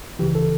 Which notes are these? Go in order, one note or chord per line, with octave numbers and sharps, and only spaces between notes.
C#2 C#3 E3 G4
A4